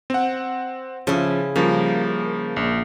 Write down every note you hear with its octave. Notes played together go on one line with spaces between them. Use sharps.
C4 F#5
C#3 F3 E4
C#3 F3 G3 A#3
A#1